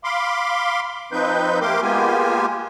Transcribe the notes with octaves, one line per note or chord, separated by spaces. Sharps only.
F5 B5 C6 D6
F3 C4 D#4 B4 G6
A3 A#3 G4 A#4 C6 D6
G#3 A#3 B3 F4 G4 G#5